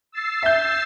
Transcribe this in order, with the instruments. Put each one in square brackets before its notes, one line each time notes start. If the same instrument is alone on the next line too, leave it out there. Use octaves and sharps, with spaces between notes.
[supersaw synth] E6 A6 C7
[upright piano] E5 G6